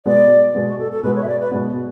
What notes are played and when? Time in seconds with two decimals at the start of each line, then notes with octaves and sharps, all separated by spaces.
0.05 B2 G#3 B3 D5
0.54 B2 G#3 B3
0.66 F#4
0.79 A4
0.91 A4
1.03 B2 G#3 B3 B4
1.15 C#5
1.22 E5
1.27 D5
1.40 B4
1.51 B2 G#3 B3